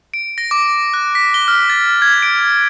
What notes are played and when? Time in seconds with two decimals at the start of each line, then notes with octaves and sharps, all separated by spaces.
0.14 D7
0.38 A#6
0.51 D6
0.94 F#6
1.15 B6
1.34 G7
1.48 F6
1.69 A6
2.02 G#6
2.23 D7